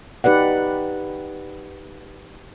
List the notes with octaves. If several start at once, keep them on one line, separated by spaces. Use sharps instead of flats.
D#4 G4 B4 D5 F#5